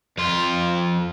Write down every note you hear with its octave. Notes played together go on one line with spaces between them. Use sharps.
F2 F4